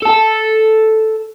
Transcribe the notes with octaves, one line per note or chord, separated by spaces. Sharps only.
A4 A5